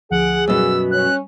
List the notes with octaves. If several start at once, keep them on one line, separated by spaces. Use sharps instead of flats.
D2 F3 G#4 F#5 D7
F#2 B2 G3 E6
C#4 F#6